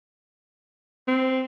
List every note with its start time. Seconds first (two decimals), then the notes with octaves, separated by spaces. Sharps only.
1.08 C4